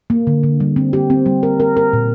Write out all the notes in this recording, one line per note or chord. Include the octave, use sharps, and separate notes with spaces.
A#3
D3
D3
G3
C4
G4
C4
G3
A#4
A#4
A#4
A#2